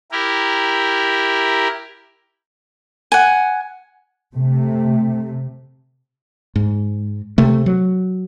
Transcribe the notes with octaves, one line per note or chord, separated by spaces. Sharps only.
E4 G4 A#4
F#5 G#5
C3 A3
G#2
C3 A3
F#3